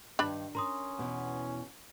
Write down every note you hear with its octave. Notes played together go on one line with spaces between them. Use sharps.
G2 D#3 D4 B5
C#4 A#4 A#5 C6 D#6
E2 B2 E3